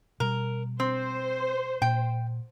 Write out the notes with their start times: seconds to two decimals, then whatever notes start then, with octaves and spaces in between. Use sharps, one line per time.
0.20 B2 G3 A#4
0.80 C4 C5
1.82 A#2 G5